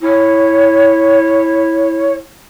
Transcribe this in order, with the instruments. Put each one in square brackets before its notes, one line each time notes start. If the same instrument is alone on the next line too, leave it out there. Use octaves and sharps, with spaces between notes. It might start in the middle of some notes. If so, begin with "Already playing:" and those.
[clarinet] E4 [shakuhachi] C#5